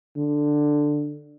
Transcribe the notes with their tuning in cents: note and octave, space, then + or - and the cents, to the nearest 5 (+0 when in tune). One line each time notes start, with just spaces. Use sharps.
D3 +10